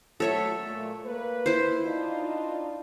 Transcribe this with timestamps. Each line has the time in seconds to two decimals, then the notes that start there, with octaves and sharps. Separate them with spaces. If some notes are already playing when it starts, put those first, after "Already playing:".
0.20 F#3 A3 A4 C#5 E5
0.65 A#2 A3
1.06 A#3 B4
1.46 E4 C5
1.84 D4 D#4 F4